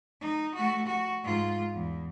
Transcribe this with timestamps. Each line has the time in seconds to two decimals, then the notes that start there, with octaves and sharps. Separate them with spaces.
0.21 D#4
0.55 A3 F#4
0.86 F#4
1.24 G#2 F4
1.73 E2